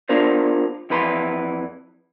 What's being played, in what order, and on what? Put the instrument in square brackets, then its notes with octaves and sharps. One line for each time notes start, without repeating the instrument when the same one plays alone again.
[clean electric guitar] B3 D4 F4 A#4 C5
F2 E3 B4 A#5 C6